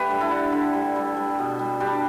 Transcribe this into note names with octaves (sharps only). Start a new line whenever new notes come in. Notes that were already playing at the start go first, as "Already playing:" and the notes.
Already playing: D3 A3 G4 B4
G3
E4 A4
D3
D3
G3
G3
G3
B2
G3
G3 D4 G4